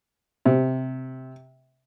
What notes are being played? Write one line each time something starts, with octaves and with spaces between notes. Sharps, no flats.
C3